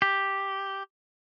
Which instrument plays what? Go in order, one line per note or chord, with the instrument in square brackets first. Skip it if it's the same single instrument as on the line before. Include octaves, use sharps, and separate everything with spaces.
[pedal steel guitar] G4